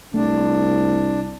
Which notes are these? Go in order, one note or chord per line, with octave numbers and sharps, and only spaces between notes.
C2 A3 D4